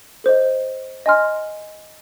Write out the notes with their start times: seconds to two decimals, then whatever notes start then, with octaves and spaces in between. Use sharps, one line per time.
0.24 A4 C5 D#5
1.06 D#5 G#5 C6 F6